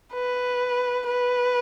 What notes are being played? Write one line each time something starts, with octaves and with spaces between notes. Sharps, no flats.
B4
B4